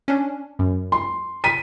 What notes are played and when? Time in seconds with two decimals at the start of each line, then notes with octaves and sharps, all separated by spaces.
0.08 C#4 D4
0.59 F#2
0.92 C6
1.44 B6 D#7